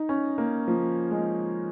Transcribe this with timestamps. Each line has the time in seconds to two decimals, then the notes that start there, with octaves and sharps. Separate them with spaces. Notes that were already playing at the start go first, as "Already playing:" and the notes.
Already playing: D#4
0.09 C#4
0.38 A#3
0.68 F3
1.11 G#3